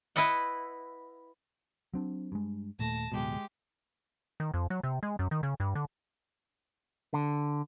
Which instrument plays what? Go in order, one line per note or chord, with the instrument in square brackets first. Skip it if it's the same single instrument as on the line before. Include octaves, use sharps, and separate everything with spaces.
[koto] E4 B4 D#5 F#5
[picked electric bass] F#3 C4 D4
G2 G#3
[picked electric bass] D#1 A#2 A3 [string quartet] A5 A#6
[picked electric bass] D1 G1 B2 [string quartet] G#3 G4
[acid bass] D#3
F2
F#3
C3
G#3
F#2
D#3
C#3
G2
D3
[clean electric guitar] D3